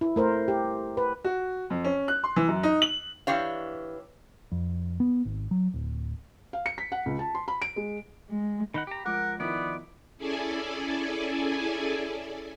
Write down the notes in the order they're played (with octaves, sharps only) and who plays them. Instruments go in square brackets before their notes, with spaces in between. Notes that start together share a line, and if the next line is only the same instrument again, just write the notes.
[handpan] E4
A3 A#4 C5
G4
B4
[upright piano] F#4
F2
C#4
F#6
C6
E3
F#2
D#4
F#7
[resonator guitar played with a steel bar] E3 D4 G4 C#5 F5
[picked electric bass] F2
B3
G#1
F#3
D1
[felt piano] F5
C#7
B6
F#5
C#2
A5
C6
B5
D7
G#3
[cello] G#3
[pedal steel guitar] D#3 D#4 F#5 [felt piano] B5
[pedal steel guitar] G4 A#5
[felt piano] F3 G#3 D6 [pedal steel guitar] A#4 [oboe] F#5
[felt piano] D#3 F3 E4 [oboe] B3 [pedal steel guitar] D5
[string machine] C#4 E4 G#4 A4 D5 G#5